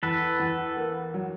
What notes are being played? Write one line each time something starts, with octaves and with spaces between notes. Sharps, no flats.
E2 A4 B4
E2
A#3
F#3